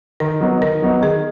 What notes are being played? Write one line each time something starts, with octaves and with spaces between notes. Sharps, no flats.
D#3 A#4
F#3 B3 D#4
D#3 A#4
F#3 B3 D#4
D#3 G#4